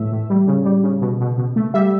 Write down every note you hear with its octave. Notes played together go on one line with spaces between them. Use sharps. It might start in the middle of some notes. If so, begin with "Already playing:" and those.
Already playing: A2 E3 A3 E5
A2
G3
C#3
G3
C#3
B2
B2
B2
A3
G3 E5